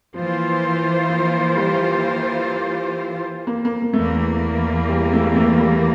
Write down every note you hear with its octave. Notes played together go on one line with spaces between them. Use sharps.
E3 F3 A#3 F4 C5
F3
G3
A#3
A#3
A#3
E2 E3 A3 A#3
G3
A3
A3
G3